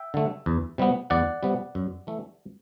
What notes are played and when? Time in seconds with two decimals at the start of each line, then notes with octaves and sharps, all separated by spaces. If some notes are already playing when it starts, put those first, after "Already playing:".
Already playing: E5 G5
0.14 D3 A3
0.46 E2
0.78 C3 G3 B3
1.10 E2 D5 F#5
1.43 C3 G3 B3
1.75 F#2
2.07 E3 A3